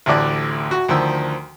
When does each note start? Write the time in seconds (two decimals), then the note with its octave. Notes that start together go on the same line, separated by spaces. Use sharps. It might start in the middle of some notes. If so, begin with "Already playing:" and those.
0.06 A1 D2 A2 D5 F#6
0.71 F#4
0.89 D2 D#3 F3 E6